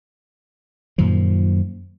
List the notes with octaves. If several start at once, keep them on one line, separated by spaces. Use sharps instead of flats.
F#2 A#2 D#3 F3